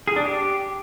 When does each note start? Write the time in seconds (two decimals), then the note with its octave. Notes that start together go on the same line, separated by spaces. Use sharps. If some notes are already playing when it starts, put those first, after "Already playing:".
0.08 G#4
0.16 D4
0.25 G4